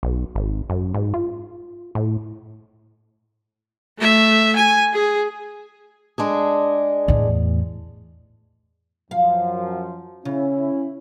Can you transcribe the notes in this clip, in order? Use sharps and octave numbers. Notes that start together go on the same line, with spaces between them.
B1
G#1
F#2
G#2
F4
A2
A3 E5
G#5
G#4
G#3 D4 G#4
E2 A2
F#2 F3 F5
C#3 C#4 E4